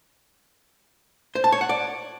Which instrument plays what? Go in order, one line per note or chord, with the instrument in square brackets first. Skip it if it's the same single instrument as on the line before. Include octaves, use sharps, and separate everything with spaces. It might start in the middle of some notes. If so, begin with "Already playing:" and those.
[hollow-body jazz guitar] C5
A5
C#5
F#5
D5